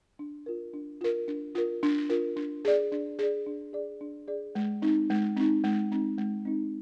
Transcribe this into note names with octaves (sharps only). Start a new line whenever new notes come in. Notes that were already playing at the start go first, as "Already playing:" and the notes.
D4
F4 A#4
D4
F4 A#4
D4
F4 A#4
D4
F4 A#4
D4
G#4 D5
D4
G#4 D5
D4
G#4 D5
D4
G#4 D5
G#3
C4 D#4
G#3
C4 D#4
G#3
C4 D#4
G#3
C4 D#4